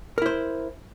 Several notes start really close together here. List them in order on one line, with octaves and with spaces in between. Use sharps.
A#4 E4 C5